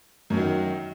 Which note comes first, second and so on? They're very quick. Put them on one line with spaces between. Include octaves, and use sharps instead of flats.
F#2 F#3 D#3